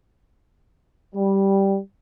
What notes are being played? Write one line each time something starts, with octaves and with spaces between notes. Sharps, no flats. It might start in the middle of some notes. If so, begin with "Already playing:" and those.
G3